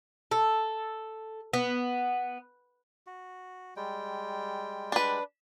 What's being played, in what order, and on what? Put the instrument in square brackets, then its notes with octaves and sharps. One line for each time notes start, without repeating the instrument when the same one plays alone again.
[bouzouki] A4
B3
[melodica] F#4
G3 G#3 G5
[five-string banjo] D4 B4